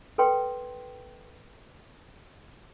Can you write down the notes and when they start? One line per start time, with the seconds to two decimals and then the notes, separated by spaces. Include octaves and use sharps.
0.18 A4 B4 G5 C6